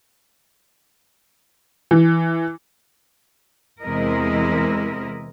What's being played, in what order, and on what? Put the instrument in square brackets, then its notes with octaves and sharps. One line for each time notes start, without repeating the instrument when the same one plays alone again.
[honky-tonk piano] E3
[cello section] E2 C3 G#3 E4 A#4 D#5